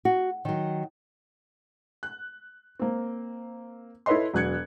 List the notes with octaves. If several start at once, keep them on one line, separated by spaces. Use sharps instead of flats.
F#4
D#3 F#3
F#6
A#3 C4
E4 A4 B4 C#5 D#5 C6
E1 F#3 F#6 G#6 C#7